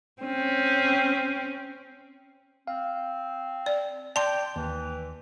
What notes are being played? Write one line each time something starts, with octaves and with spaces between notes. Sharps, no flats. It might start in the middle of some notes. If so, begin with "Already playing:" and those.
C4 C#4
C4 F5
D5
D5 G5 A5 C6
D#2 E3